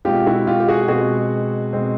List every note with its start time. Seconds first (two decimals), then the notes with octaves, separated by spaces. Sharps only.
0.05 B2 G#3 C4 F4 G4
0.26 E4 F#4
0.47 F4 G4
0.60 G4
0.68 F#4 G#4
0.88 B2 G#3 C4 F#4 G#4
1.73 B2 G#3 C4